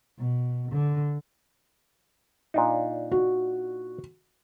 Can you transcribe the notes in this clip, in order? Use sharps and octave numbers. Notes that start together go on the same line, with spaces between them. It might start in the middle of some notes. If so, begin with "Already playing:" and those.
B2
D3
A#2 D4 D#4
F#4